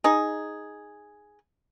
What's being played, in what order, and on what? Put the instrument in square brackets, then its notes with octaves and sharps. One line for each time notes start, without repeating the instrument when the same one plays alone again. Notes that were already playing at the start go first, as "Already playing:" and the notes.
[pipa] D#4 G#4